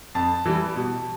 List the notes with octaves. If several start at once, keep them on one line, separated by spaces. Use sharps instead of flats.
F2 A5
E3 G3
B2